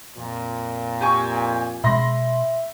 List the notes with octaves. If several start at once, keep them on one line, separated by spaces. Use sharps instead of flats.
F2 A#2
G4 G#5 C#6
B2 G#3 E5 B5 C6 A#6